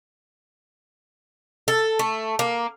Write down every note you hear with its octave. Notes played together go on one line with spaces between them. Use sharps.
A4
A3
A#3